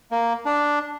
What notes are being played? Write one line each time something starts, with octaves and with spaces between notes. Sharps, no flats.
A#3
D4